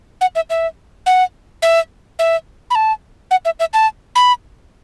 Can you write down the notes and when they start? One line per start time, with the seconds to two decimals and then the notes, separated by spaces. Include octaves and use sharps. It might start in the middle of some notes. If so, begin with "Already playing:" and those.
0.21 F#5
0.35 E5
0.50 E5
1.06 F#5
1.62 E5
2.19 E5
2.70 B5
2.75 A5
3.31 F#5
3.45 E5
3.60 E5
3.73 A5
4.15 B5